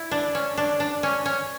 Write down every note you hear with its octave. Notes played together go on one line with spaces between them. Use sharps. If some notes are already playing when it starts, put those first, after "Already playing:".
Already playing: E4
D4
C#4
D4
D4
C#4
C#4